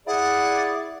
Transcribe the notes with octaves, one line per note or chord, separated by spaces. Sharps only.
E4 G#4 D5 F#5